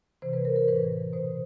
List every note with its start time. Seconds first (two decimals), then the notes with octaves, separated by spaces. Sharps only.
0.22 C3 E3 C5
0.33 B4
0.45 A#4
0.56 A#4
0.68 A2 E3 B4
1.13 B2 C5